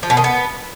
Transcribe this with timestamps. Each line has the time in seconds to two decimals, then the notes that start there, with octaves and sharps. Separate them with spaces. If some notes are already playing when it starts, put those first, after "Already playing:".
0.03 F3
0.10 B2
0.17 D#3
0.24 B3